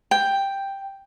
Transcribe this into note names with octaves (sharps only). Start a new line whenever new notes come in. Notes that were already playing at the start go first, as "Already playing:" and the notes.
G5